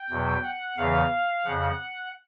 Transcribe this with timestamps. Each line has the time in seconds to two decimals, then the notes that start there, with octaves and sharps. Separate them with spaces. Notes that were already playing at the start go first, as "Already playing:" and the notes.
Already playing: G5
0.10 E2 B2 F#3
0.44 F#5
0.77 E2 C#3 E3 F5
1.45 F2 C#3 F3 F#5